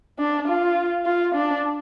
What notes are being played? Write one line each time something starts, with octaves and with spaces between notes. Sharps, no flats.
D4
F4
F4
D4